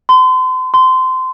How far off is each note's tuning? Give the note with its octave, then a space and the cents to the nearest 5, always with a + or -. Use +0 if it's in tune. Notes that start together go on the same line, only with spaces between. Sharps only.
C6 -35
C6 -20